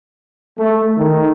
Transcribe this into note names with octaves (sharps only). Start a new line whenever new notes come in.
A3
D#3